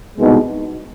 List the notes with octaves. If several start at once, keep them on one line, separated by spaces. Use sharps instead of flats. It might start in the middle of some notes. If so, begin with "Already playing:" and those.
C2 B2 G#3 B3 D#4